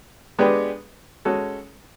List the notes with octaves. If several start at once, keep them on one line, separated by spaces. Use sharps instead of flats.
G#3 B3 D4 G4 B4
G#3 C#4 F#4 A4